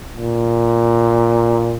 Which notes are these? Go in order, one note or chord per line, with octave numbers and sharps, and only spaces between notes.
A#2